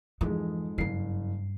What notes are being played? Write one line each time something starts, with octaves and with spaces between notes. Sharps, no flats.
F2 G#2 E3 G#3
F#1 G2 D4 C7